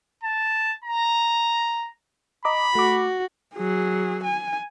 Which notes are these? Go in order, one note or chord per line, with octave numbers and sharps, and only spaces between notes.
A5
A#5
D#5 A#5 B5 D6
A3 F#4 D6
F#3 G#4
G#5